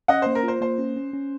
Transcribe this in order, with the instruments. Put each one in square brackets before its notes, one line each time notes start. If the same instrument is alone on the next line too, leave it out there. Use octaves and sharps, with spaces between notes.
[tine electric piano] C#4 [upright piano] D#5 F#5
[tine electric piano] A#3 [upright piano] C5
[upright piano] A#4
[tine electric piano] F4 [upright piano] C5
[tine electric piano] A#3 [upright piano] C5
[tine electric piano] C#4
C#4
C#4